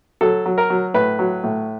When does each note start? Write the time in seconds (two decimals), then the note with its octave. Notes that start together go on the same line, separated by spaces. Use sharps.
0.21 F#3 A4
0.46 F#3
0.58 A#4
0.70 F#3
0.94 A2 B4
1.19 F#3
1.44 A2